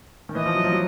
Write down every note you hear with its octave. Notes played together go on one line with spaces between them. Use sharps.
D#3
E3 D#5
F3
F#3
F3
F#3